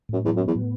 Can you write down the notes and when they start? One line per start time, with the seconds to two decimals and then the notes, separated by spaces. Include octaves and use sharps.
0.09 F#2 A2
0.24 E2 F#3
0.37 F#2
0.40 B3
0.48 E2
0.55 A2